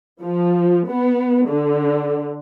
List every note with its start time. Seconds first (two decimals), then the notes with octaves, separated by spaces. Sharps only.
0.22 F3
0.88 B3
1.47 D3